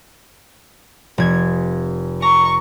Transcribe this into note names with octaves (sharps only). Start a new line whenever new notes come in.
F1 G#6
A#5 C#6